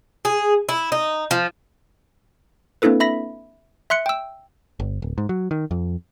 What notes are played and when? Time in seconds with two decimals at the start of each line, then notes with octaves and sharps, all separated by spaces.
0.25 G#4
0.69 E4
0.92 D#4
1.31 F3
2.82 A#3 C4 D4 E4 A4 B4
3.00 E5 B5 A#6 B6
3.90 E5 C6 F#6 C#7
4.06 G5 E6
4.80 G1
5.02 D1
5.18 G#2
5.29 F#3
5.51 D#3
5.71 F2